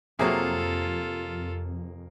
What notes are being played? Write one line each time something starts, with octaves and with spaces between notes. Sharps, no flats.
F2 C3 F#3 A#3 F4 G#4 A4